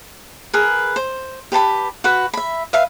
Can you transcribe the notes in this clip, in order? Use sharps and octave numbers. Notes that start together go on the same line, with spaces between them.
G#4 A#4 B4
C5
G4 B4 A5 B5
F#4 B4 B5
E5 B5
B4 E5 F5